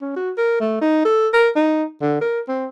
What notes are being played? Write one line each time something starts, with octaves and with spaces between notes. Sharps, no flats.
C#4
F#4
A#4
A3
D#4
A4
A#4
D#4
D3
A#4
C4